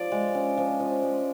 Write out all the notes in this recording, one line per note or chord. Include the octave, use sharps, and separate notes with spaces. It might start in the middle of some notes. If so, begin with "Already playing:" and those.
Already playing: F3 D5
G#3
C#4
F3
F3
G#3